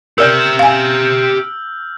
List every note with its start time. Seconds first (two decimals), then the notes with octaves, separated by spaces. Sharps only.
0.18 G4 A#4 D5 E5 E6 F6 G6
0.59 F5 G#5